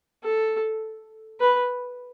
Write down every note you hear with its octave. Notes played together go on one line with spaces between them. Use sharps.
A4
B4